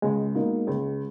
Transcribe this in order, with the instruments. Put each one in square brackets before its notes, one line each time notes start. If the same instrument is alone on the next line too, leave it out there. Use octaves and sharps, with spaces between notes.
[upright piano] C#2 [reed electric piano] G#3
[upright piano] B2 A#3 D#4
C#2